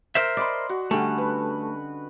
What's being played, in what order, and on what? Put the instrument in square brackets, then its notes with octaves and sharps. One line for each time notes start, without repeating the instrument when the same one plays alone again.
[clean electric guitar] A#4 C5 E5
[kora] D5 [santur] D#5 B5 C6
[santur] F#4
[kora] D3 G3 C#4 [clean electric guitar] A3
[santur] B4